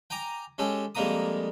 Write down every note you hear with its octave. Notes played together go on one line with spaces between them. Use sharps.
G5 G#5 A#5 D6
G#3 C#4 G4 A4
F2 G3 G#3 A#3 A#5 D#6